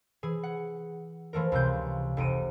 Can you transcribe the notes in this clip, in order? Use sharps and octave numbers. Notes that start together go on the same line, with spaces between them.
E3 G#4
F#5
E3 F3 A3 A#4
C#2 C3 G6
F1 D#4 D7 D#7